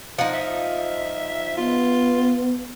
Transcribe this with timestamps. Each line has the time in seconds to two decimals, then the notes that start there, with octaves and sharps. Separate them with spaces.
0.19 F3 D#4 F#5
0.34 E5
1.57 B3 F4